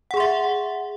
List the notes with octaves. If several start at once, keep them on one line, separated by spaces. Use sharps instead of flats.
G#4 E5 F#5 C6